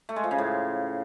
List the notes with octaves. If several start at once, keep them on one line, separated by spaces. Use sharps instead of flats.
A3
G#3
F3
C#3
A2